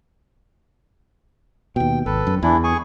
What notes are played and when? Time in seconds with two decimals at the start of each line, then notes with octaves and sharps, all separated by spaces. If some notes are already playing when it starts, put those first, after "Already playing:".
1.76 D#2 B2 G5
2.06 G#1 A4 B4
2.27 F#2
2.43 E2 E3 D4 E4
2.64 G#4 G#5 C#6